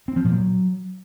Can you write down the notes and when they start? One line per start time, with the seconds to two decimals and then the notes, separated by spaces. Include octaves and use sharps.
0.08 C4
0.16 F3
0.25 A#2
0.33 F#3